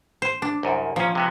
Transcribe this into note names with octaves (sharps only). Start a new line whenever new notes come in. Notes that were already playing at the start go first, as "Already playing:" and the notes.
C5
D4
C2 F#2
A#2 F3 C#4
C3 G#3 B3